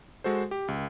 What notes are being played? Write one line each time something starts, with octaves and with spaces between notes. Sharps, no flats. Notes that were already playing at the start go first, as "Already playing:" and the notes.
G#3 F#4 A4 C5
G4
C#2